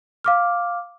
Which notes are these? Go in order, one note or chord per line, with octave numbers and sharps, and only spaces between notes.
F5 D6 F6